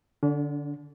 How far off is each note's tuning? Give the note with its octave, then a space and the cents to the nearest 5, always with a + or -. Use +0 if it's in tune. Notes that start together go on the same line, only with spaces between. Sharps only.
D3 +0 D4 -40